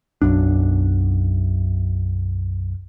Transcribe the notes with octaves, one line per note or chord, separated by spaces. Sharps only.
B1 F#2 D4